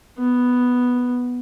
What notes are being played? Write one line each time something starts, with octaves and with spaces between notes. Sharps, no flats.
B3